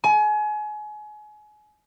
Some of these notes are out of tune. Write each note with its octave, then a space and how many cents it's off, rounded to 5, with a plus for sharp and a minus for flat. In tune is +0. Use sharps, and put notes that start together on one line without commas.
G#5 +30